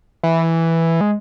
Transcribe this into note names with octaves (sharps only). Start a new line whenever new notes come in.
E3
G#3